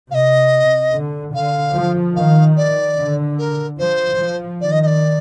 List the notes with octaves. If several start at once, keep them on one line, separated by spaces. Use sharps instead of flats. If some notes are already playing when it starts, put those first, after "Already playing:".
C3 D#5 F5
D3
D3 F5
F3
D#3 F5
D5
D3
A#4
F3 C5
F3
D#3 D5
D#5
D#5
D5